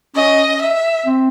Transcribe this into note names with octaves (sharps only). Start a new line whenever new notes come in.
C#4 D#5
E5
C4